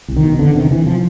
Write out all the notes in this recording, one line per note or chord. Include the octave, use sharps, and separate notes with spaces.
C2
D#3
B2
E2 D3
C3 D#3
C3 E3
F3